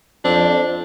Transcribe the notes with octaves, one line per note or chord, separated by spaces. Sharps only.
F2 C4 D4